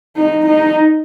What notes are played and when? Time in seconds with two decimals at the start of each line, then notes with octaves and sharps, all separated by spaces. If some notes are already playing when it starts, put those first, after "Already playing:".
0.17 D#4
0.46 D#4